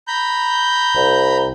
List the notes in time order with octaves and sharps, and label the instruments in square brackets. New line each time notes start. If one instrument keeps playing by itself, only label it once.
[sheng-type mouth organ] A#5 B5 G6
[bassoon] C2